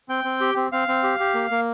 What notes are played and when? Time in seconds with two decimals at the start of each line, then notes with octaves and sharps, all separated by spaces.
0.09 C4 G5
0.24 C4
0.41 G4
0.57 C4
0.72 C4 F5
0.88 C4
1.03 G4
1.20 G4
1.34 A#3
1.51 A#3